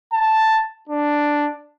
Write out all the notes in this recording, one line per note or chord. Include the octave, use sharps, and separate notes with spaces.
A5
D4